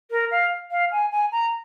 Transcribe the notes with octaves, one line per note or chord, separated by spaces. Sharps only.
A#4
F5
F5
G#5
G#5
A#5